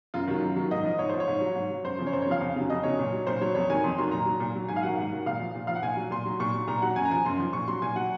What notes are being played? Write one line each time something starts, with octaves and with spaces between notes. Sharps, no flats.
F#2 F4
D#3 F#3
F#2
D#3 F#3
G#2 D#5
F3
G#2 C#5
F3 C5
C#5
G#2
F#3
G#2
F#3
F#2 C5
C#3 F3
C#5
F#2 C5
C#5
C#3 F3 F5
F2 F5
C#3 F#3
F2 D#5
C#3 F#3 C#5
A#2
F#3
A#2 C5
F#3 C#5
F2 C#5
D#3 F#3 G#5
F2 C6
D#3 F#3 C6
A#2 A#5
F#3
A#2
F#3
G#2 G#5
F5
D#3 F#3 F#5
G#2
D#3 F#3
A#2 F5
F3
A#2
F3 F5
F#5
A#2 G#5
F#3
A#2 C6
F#3
A#2 C#6
F#3
A#2 A#5
F#3 F#5
F#2 G#5
A#5
F3 G#5
F#2 C6
F3
A#2 C#6
F#3 C6
A#2 G#5
F#3 F#5